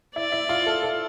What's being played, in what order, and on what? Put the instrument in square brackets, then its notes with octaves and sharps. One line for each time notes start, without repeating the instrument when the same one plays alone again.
[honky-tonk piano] E4 [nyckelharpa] D5
[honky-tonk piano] E4
F4
A4
A4